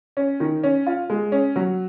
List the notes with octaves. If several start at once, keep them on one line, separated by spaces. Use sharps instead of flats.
C#4
D#3
C#4
F4
G#3
C#4
F#3